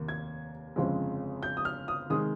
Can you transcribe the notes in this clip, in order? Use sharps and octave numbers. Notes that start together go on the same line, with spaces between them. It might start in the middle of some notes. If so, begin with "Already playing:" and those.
Already playing: F1 D#2 D#3 A#3
G#6
G1 F2 C#3 G#3 C4
G6
D#6
F6
D#6
C3 D#3 G#3 D#6